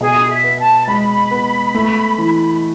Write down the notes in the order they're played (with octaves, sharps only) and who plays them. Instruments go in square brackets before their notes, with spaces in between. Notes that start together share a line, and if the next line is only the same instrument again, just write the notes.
[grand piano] B2 [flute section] G#4
[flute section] E5
[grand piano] B3
[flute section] A5
[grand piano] G#3 [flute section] B5
[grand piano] B3
A3
E3